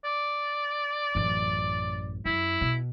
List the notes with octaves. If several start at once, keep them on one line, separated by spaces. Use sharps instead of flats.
D5
A1 F#2
F#2 E4
B2